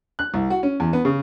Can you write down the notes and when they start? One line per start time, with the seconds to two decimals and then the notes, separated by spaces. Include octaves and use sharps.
0.19 F#6
0.34 C2
0.50 F#4
0.63 C#4
0.80 E2
0.93 B3
1.05 C#3